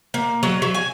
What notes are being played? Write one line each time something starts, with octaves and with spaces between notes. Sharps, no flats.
A#3
F#3
F#3
G#5